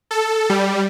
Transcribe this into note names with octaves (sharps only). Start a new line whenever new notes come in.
A4
G3